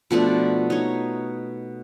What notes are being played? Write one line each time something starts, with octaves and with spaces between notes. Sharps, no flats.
B2 F3 A3 D4
D#4 C#5